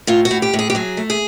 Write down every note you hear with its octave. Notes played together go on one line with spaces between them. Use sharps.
A2 F4
F#4
A2
G4
A2
G#4
G4
F#3 G#4
A3
G#4